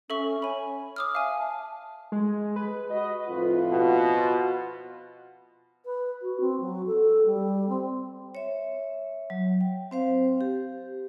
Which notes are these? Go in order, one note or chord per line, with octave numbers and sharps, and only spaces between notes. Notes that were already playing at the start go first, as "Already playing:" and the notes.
C#4 A4 E5 C#6
C#5 G#5 B5
D6 D#6 F6
E5 F5 G#5
A5
G#3
B4
F#4 D#5
F2 A2 F4
B2
F4
B4
F#4
C4
F#3
A4
G3
C4
C#5 E5
F#3
G5
C4 C5 F5
G4